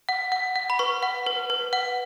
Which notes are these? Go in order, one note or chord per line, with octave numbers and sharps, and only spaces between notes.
F#5
F#5
F#5
B5
B4 C#6
F#5
B4
B4
F#5